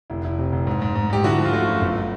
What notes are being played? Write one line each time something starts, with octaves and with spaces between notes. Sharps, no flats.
F1 E4
F1 E4
C3
F1
G#2
G#2
G#2
G#2 G4
D3 E4 F#4
F3
F4
A3 E4 F#4
F#2
G1